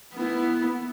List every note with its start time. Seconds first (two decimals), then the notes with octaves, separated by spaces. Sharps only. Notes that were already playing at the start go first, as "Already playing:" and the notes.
0.14 B3 E4